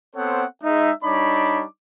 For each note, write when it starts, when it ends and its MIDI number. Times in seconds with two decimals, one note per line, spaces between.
0.15 0.44 59
0.15 0.44 60
0.15 0.44 69
0.15 0.44 72
0.15 0.44 73
0.15 0.44 78
0.63 0.91 56
0.63 0.91 63
0.63 0.91 76
1.04 1.64 55
1.04 1.64 62
1.04 1.64 63
1.04 1.64 73
1.04 1.64 83
1.04 1.64 86